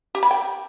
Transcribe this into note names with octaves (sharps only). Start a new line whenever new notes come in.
G4
B5
G5